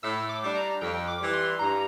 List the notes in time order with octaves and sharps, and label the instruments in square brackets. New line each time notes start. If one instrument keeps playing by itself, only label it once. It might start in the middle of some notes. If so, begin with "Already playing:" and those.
[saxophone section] A2 [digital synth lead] E6
[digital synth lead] D6
[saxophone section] G3 D4
[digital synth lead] A#5
[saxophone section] F2 [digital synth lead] G5
[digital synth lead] D6
[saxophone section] E3 G3
[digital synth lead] C6
[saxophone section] G2 [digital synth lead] A#5